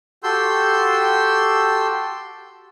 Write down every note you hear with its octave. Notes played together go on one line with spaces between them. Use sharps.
F#4 G4 A4 C6 E6 G6